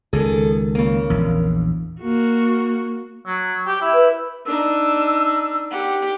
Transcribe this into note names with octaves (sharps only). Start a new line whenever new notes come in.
C#2 D#3 G#4 A4
C#3 A#3
A#1 E2
A#3 F#4
F#3
G4
E4
B4
D4 D#4 E6
G4 F#5